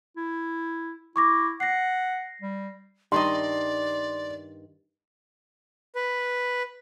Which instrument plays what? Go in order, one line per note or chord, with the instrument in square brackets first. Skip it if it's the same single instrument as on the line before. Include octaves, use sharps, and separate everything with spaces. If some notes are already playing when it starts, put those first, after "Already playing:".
[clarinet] E4
[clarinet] E4 [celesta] C#6 D6 A#6
[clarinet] F#5 [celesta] A#6 C7
[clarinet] G3
[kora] G2 D#3 D#5 [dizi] D5 [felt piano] C6
[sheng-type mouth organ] B4